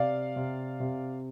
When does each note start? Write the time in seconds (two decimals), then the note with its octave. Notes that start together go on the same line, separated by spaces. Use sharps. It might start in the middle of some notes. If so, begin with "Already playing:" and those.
Already playing: C3 D5 F5
0.36 C3
0.80 C3